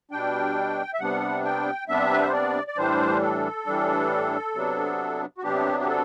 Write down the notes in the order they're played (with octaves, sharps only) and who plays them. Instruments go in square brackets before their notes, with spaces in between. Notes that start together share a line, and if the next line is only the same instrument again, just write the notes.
[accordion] B2 G3 D4 G5
E5
C3 G3 B3 D4 F#5
G5
C3 G3 B3 D4 E5
B4
C5
D5
D5
A2 E3 G3 D4 C5
A4
A2 E3 G3 D4
C3 F#3 B3 D4
F#4
C3 F#3 B3 D4 G4
G4
A4